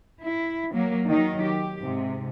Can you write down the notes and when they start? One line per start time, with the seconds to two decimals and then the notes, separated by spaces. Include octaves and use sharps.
0.23 E4
0.74 F#3 A#3
1.07 D#3 F#3 D#4
1.43 G4
1.81 G#2 C3